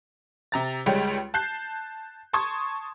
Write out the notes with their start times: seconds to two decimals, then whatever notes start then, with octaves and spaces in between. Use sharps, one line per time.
0.52 C3 A#5 A6
0.86 C#2 G3 G#3 C#5 G5
1.34 A5 F#6 G6 C7
2.33 A5 C6 C#6 D#6 G#6